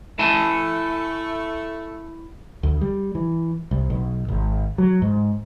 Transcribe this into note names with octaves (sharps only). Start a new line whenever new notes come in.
A3 E4 G#5 A5
D2
G3
E3
C2
B1
G#1
F#3
G#2